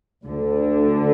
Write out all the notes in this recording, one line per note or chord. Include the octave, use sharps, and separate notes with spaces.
D2 D3